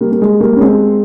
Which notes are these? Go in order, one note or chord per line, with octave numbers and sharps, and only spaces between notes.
G3 A#3
A#3
G#3
G3 A#3
C#4
G#3 C4